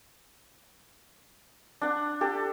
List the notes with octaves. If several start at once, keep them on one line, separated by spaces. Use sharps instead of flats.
D4 F#5
G4 A4